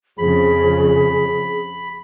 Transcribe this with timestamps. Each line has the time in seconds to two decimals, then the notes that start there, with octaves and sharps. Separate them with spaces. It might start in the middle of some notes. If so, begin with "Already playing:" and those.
0.18 F2 C#3 G#4 B5